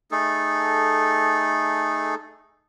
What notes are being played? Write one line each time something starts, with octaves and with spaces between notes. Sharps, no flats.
A3 D#4 G#4 A4